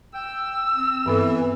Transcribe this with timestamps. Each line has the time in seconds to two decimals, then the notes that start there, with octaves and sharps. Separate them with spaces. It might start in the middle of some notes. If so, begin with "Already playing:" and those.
0.14 G5 E6
0.75 C4
1.06 G2 E3 B3 A4